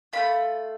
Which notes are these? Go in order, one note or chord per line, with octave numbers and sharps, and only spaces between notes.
A3 C#4 F4 B5